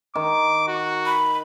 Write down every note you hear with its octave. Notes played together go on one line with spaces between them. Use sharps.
D#3 D6
F#4
B5